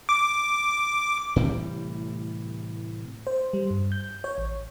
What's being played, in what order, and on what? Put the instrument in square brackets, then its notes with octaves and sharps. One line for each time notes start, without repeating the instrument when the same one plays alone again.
[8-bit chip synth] D6
[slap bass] A2 C3 E3 G3
[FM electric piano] C5
G3
G2
G6
C#5
A1